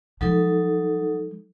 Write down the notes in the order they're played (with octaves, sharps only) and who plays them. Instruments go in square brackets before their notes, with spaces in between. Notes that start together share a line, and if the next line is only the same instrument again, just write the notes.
[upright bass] F3 G#3 [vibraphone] F#3 D#4 A4